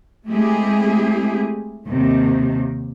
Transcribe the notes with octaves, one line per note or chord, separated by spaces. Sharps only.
G#3 A3 C4 E4 G4 G#4
D#2 C3 D#3